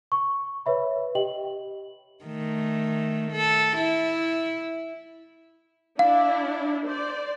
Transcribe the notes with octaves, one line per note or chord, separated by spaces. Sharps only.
C#6
B4 C#5 E5 B5
G4 D#5 G5 F#7
D#3 A3
A4
E4
D4 E4 F5
C5 D5